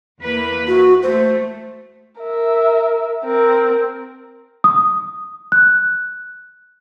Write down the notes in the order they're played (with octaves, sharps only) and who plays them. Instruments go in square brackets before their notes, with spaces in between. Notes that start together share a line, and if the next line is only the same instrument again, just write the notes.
[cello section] E2 A#3 B4
[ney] F#4
[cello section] A3 [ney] C5
[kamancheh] A#4 E5
C4 A#4
[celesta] D#6
F#6